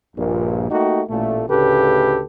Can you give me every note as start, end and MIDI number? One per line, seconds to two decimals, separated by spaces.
0.16 0.67 34
0.16 0.67 43
0.16 0.67 46
0.70 1.01 57
0.70 1.01 58
0.70 1.01 63
0.70 1.01 66
0.70 1.01 67
1.09 1.43 33
1.09 1.43 46
1.09 1.43 57
1.49 2.21 38
1.49 2.21 45
1.49 2.21 49
1.49 2.21 67
1.49 2.21 69
1.49 2.21 71